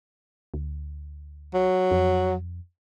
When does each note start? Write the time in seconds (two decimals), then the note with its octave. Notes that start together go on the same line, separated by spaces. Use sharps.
0.54 D2
1.54 F#3
1.91 F2